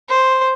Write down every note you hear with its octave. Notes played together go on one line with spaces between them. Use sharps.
C5